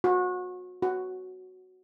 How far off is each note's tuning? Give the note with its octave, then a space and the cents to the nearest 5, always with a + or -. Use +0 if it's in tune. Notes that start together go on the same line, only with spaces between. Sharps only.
F#4 -30
F#4 +0